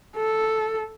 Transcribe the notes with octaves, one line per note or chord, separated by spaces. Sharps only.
A4